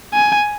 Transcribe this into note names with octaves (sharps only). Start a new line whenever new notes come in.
G#5